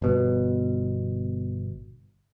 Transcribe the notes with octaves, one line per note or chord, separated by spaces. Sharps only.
G1 B2